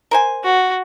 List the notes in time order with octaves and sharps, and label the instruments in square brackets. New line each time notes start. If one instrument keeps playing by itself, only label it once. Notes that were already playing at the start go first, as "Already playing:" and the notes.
[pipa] A#4 C5 G#5
[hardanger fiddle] F#4